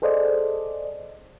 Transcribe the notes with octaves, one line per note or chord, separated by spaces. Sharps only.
G#4 A4 C5 D5 D#5